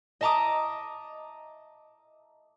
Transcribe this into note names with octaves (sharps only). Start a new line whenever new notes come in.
D#5 E5 A5 A#5 D6 D#6